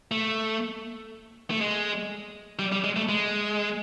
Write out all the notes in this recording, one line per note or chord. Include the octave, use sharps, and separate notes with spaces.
A3
A3
G#3
G3
G3
G#3
A3
G#3